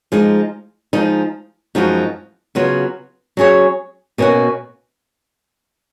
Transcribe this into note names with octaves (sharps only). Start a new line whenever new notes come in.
F3 G#3 D#4
F3 G#3 D#4
F#2 F3 G#3 D#4 F#4
C#3 F#3 B3 F4
F#3 C#4 G#4 C#5
B2 A#3 C#4 F#4